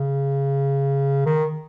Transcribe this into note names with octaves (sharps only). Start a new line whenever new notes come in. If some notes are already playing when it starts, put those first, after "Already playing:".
Already playing: C#3
D#3